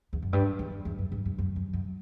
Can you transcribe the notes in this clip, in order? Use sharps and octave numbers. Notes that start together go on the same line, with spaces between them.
E2
F#2
G2
E2
E2
F#2
G2
G2
F#2
F#2
F#2